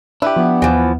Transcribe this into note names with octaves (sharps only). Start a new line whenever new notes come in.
D4 E4 G4 B4 E5
F3 B3
D#2 E3 F3